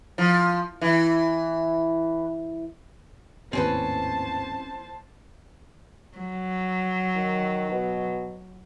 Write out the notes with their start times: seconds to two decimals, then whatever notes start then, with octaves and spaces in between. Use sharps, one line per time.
0.18 F3
0.81 E3
3.53 G#1 D#2 A2 C4 C#4 B4 C5 A5
6.17 F#3
7.15 D#3
7.70 B2